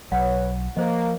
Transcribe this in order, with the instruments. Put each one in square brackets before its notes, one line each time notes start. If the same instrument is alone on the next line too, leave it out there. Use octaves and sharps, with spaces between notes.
[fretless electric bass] B1 F#3 [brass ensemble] B4 C#5 [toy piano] F#5
[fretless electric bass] F3 [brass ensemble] A#3 [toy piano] C5 D#5